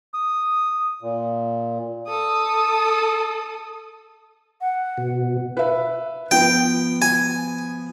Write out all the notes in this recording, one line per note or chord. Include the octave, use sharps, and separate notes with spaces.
D#6
A#2
A4 D#6
F#5
B2
B4 E5
F3 B3 G5
G#5